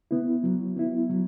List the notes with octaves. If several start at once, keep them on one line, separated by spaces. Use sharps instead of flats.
B3 E4
F#3
B3 E4
F#3